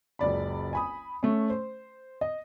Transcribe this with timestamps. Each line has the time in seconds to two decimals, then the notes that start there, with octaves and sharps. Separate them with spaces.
0.19 F#1 C#2 D5 B5
0.73 G#5 B5 D#6
1.23 A3 C#4
1.50 C5
2.21 D#5